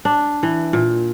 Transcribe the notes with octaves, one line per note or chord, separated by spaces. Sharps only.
D4
E3
A#2